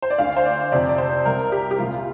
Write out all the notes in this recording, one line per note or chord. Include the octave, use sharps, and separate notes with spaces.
C5
D5
D2 D3 F5
C5
D5
F2 C3 D5
D5
C5
C2 C3 A#4
G4
G4
C2 A#2 F4